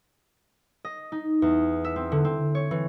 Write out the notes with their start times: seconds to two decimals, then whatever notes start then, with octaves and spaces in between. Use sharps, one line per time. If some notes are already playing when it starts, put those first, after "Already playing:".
0.85 D#5
1.12 D#4
1.42 E2
1.85 E5
1.96 C4
2.12 D3
2.25 C4
2.55 C#5
2.71 E3